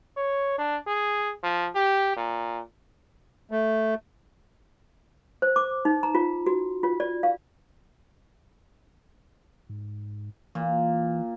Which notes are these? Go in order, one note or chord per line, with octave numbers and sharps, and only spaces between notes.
C#5
D4
G#4
F3
G4
A#2
A3
C5
D6
D#4
A#5
F4
F#4
F4
D5
F5
G#2
A#2 E3